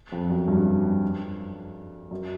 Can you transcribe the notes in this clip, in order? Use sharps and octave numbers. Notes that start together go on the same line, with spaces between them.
F2
F#2
G2
F#2